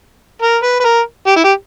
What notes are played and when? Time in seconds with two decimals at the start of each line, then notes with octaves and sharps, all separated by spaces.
0.42 A#4
0.63 B4
0.80 B4
0.85 A#4
1.27 G4
1.36 E4
1.44 G4